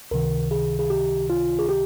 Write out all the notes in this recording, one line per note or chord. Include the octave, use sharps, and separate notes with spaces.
C#2 C3 D#3 A#4
G#4
G#4
G4
F4
G#4
G4